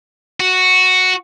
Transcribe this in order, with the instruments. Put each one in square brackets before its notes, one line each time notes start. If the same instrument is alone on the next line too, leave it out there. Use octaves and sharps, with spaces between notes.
[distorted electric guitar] F#4